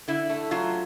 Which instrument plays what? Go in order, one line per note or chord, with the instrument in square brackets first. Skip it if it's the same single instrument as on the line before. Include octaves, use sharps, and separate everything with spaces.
[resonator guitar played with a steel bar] D3 E4
A3
F#3 F4